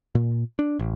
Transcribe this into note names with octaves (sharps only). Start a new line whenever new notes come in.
A#2
D4
A1